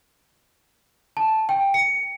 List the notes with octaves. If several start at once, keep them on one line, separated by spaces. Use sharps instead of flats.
A5
G5
C#7